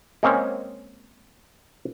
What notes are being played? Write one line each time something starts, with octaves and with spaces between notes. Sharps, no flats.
G#3 A#3 C4 C#4